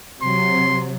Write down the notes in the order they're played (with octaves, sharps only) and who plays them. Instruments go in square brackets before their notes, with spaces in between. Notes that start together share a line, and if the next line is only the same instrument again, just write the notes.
[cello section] C3 F#3 [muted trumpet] C6